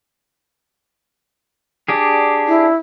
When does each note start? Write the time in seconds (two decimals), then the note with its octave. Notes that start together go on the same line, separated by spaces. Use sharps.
1.88 D4 G4 G#4
2.47 E4